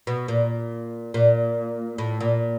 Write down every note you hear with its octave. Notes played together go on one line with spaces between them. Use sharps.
B2
A#2
A#2
A2
A#2